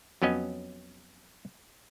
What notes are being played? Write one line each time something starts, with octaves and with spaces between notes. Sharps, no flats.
F2 F#3 B3 C#4 D#5